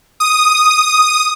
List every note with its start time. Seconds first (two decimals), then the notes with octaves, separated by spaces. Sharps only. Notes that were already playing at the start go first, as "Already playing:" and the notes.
0.20 D#6